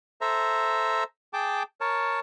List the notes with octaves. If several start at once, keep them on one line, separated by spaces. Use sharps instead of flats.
A4 C5 E5 A#5
G#4 G5 A5 D6
A#4 C#5 A5